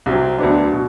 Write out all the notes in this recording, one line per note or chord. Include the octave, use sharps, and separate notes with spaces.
C2 C3 F#3 C4
D2 D3 F#3 B3 D4
B2